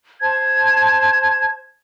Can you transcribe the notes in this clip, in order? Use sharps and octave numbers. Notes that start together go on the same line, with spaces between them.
C5 A5 G#6